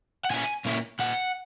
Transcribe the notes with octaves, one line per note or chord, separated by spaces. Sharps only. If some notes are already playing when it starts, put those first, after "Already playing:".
F#5
A#2 A#3 C#4 E4 G#5
A#2 A#3 C#4 E4
A#2 A#3 F#5